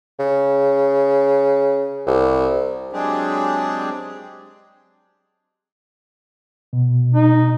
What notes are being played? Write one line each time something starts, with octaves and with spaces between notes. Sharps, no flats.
C#3
C2
F#3 G#3 C4 D4 G4 G#4
B2
D#4